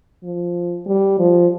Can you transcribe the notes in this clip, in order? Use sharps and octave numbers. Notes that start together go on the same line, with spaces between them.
F3
G3
F3